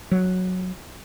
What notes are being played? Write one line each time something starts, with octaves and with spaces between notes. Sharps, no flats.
F#3